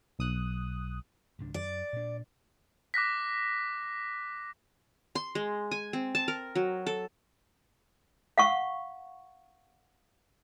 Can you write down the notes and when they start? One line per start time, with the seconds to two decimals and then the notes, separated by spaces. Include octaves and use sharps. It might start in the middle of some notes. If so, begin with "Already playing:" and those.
0.19 B1 D#6 F#6
1.39 G#1 C#2 D4
1.54 F#2 D5
1.93 A#2 D4
2.94 D6 F#6 A#6 B6
5.15 C6
5.35 G#3
5.71 G#5
5.93 C4
6.15 A5
6.28 A#4
6.56 F#3
6.87 A4
8.38 F5 F#5 C#6